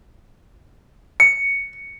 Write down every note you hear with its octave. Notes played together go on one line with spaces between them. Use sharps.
C#7